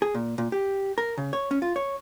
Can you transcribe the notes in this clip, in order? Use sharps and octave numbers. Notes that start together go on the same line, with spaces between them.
G#4
A#2
A#2
G4
A#4
C#3
C#5
C#4
F4
C#5